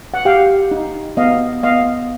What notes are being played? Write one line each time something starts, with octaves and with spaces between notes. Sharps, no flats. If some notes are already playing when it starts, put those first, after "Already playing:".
F#5
G4 F5 G5
D#4
B3 D#5 F5
B3 D#5 F5